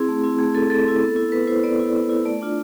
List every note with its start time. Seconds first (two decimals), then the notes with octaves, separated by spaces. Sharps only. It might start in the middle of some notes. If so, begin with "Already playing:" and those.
Already playing: C4 E4 G#4
0.09 A3
0.24 C4 E4
0.39 A3 G#4
0.55 C4 E4 A4
0.70 A3 A4
0.85 C4 E4
1.02 B3
1.16 E4
1.32 B3 B4
1.47 E4 C5
1.63 B3 D5
1.80 E4
1.95 B3
2.10 E4
2.25 A3 D5
2.42 D4 F4